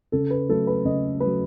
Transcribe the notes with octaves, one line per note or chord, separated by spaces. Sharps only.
C#3 A4
B4
F#3 A3 A4
B4
C#3 D#5
F#3 A3 B4